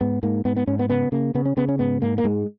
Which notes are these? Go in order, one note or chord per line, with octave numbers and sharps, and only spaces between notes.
G#2 B3
G#2 A#3
G#2 B3
B3
G#2 C#4
B3
C#3 B3
C#3 A#3
C#3 B3
C#4
C#3 B3
C#4
G#2 B3
G#2 A#3
A#3
G#2 G#3